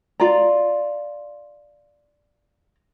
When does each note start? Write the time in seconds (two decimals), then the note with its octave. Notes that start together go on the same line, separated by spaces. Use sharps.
0.20 F4 D5 A#5